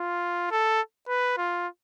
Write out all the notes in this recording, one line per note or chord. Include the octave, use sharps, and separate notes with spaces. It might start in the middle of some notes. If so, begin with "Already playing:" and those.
Already playing: F4
A4
B4
F4